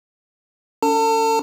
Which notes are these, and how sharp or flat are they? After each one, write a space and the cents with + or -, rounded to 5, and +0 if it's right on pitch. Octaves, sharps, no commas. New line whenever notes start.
C#4 +40 A4 +35 A5 +35